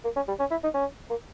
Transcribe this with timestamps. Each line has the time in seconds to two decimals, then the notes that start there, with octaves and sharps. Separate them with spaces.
0.04 A#3
0.16 C#4
0.28 G3
0.39 C#4
0.51 E4
0.63 D#4
0.74 C#4
1.10 A#3